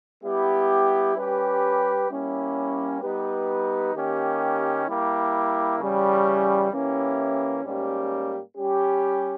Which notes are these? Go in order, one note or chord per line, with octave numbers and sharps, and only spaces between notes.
G3 B3 E4 G4
G3 C#4 G4 B4
G3 A#3 C#4 E4
G3 B3 D#4 G4 B4
D#3 A#3 C#4 G4
G3 A#3 E4
C#3 E3 G3 C#4
E3 A#3 C#4 E4 G4
G#2 G3 A#3 C#4 G4
G3 C#4 G4